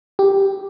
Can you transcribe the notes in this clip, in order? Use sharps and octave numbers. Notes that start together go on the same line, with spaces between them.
G4